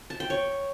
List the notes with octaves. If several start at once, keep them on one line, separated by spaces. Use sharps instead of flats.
A5
G5
C#5